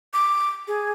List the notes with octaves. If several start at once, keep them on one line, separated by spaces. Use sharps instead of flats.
D6
G#4